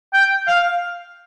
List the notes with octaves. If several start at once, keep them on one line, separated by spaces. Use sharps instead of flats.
G5
F5